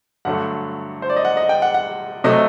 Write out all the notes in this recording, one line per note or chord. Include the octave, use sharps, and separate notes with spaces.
G2 D3 F#3 A3 F#5
C5
D5
D#5
F#5
D#5
G5
F#5
F#5
C3 F#3 A3 D#5